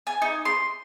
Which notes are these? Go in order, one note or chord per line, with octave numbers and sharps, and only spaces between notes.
G#5
D#4
C6